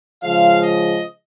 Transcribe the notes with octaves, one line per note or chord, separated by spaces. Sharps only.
C#3 F3 G#3 F5
D#5